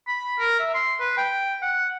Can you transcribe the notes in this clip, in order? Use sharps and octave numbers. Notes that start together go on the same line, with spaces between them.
B5
A#4
E5
C6
B4
G5
F#5